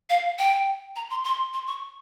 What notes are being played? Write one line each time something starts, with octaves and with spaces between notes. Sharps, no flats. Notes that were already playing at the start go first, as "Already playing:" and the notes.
F5
G5
A#5
C6
C6
C6
C#6